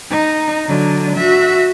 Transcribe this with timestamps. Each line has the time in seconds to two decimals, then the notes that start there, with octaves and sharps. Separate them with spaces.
0.10 D#4
0.66 D3 F#3
1.15 F#4 E5